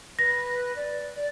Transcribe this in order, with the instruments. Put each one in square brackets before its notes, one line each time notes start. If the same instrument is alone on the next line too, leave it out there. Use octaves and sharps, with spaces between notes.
[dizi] B4 [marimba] A#6
[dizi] D5
D5